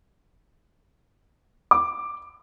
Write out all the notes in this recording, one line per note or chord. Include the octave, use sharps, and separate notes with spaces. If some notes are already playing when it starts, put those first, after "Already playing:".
D6